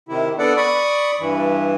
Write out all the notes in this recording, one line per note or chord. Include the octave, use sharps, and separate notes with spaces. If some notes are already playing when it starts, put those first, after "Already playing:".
C3 D#3 E4
B3 D4 A4 D5 F#5
D5 B5 C#6 D#6
G2 E3